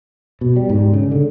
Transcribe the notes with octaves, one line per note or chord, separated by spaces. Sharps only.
B2
G3
G#2
C#3
D3